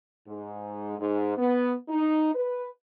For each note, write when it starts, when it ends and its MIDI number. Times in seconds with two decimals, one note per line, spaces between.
0.28 0.98 44
0.99 1.36 44
1.37 1.74 59
1.89 2.32 63
2.35 2.69 71